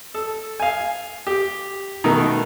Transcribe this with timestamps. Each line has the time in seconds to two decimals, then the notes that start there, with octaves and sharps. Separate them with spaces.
0.14 A4
0.60 F5 G#5
1.27 G4
2.04 B2 D#3 A3 D#4 A#4